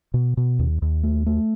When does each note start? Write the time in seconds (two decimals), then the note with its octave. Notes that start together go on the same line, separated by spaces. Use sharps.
0.14 B2
0.37 B2
0.59 D#2
0.82 D#2
1.03 A3
1.26 A3